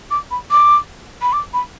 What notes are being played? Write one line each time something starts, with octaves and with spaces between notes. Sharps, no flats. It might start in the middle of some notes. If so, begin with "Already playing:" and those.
D6
B5
D6
B5
D6
B5